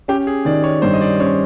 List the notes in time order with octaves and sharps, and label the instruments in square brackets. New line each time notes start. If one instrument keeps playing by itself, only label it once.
[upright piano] C#4 [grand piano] G4
[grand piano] G#4
[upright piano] D#3 [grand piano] D5
[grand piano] C#5
[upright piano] G2 [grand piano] C5
[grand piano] D#5
D5
[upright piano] C#4 [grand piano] C#5